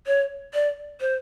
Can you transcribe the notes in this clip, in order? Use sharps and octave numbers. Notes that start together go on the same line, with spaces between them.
C#5
D5
C5